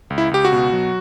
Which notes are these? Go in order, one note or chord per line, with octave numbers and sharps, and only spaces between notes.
C#2
E4
C#2 G4
F#4
B2
F#3